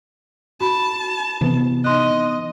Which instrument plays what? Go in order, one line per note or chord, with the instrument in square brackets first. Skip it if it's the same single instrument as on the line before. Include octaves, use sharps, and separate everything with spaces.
[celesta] F#4 B5 [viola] A5
[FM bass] C3 [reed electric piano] E3 B3
[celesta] D#4 C6 F#6 [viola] D#5